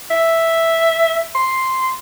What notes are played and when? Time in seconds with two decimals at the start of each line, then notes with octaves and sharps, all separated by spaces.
0.11 E5
1.35 C6